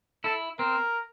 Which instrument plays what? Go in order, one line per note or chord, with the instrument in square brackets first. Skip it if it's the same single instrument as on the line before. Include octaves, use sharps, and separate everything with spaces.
[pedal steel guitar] E4 [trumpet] A4
[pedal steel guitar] C4 [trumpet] A#4